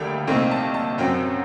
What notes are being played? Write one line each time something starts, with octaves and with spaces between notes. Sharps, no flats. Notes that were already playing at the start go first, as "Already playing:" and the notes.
Already playing: D2 D3 G3 A#3 G5
C2 A#2 A3 C4 D#4 G5
A5
A5
F#2 F#3 C4 G5